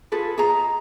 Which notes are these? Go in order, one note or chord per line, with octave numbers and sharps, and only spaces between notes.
F4 G#4 A4 B4
G#4 D#5 A#5